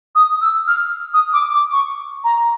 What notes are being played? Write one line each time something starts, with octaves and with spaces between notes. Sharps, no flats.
D#6
E6
F6
D#6
D6
D6
C#6
A#5